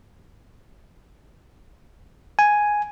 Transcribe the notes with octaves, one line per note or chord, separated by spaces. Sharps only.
G#5